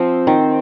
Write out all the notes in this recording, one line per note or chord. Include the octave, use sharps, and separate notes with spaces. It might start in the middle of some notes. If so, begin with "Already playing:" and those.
Already playing: F3 C4
D#3